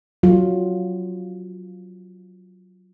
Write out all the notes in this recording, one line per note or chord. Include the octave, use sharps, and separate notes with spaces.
F#3 F4